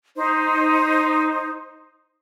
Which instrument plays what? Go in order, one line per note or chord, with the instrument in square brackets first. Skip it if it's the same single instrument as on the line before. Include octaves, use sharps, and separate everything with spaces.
[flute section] D#4 C5